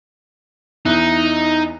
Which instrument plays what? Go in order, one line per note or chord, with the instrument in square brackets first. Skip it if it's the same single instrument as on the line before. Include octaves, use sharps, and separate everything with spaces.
[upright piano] E2 E4 F#6 [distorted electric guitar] D#4